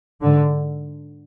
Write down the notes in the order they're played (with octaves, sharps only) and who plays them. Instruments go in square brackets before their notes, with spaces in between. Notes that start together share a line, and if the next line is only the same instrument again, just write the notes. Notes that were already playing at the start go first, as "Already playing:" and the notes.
[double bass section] G#2 D3